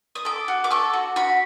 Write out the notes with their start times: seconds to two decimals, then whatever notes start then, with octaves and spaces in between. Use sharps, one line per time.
0.15 D#6
0.25 A4 D6
0.48 F#4
0.64 D6
0.70 A4 C#6
0.93 F#4
1.16 F#4 B5